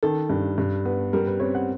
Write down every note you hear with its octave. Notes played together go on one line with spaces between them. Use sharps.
D#3 A4
G2
G2
B3
G3 A#4
B4
C4 C#5
F#5